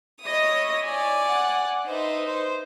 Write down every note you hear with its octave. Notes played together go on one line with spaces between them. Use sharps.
E4 C#5 D#5 D#6
D5 G#5
F#5
D#4 B4 C5 E5
C5